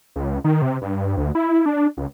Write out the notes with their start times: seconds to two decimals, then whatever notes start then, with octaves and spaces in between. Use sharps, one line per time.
0.16 C#2
0.44 D#3
0.62 C3
0.82 G2
1.17 D2
1.35 E4
1.66 D4
1.97 C#2